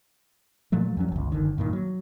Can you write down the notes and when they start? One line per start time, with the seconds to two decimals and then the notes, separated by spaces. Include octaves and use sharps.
0.72 A#2 F3 F#3 A3
0.97 E2 F#3 C#4
1.12 G1 C#2
1.32 F#1 D3 D#3
1.58 G2 A#2 D#3
1.73 F#3